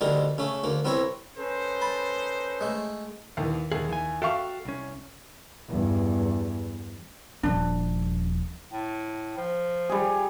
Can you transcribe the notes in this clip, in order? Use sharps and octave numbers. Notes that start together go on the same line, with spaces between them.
D2 D3 G3 D#4 A#4
C#3 A3 C#4
D2 A#3
C2 B3 C4 E4 C#5 A#5
C#4 D#4 A4 B4 C5
A5 B5
G#3 A3
D#2 E3
D#2 G#4
E3 G#5
F#4 A4 E5 F5 G5 C#6
C2 C#4
E2 G2
D#1 F3 D4
A2
F3
G3 G#4